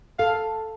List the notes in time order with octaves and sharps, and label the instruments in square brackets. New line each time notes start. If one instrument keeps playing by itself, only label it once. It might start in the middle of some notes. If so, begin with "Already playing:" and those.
[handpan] A4 [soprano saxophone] F5